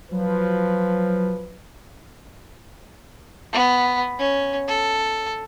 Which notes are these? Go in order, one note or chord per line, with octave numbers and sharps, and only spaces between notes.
F3 F#3 B4
B3
C#4
A4